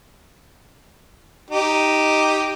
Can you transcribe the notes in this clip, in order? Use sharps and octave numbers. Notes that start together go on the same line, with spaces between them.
D#4 G4